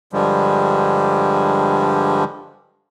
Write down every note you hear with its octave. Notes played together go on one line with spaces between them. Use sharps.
G2 D3 F3 G3 G#3